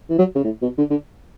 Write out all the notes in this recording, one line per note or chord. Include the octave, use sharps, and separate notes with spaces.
E3
F#3
C#3
A2
B2
D3
D3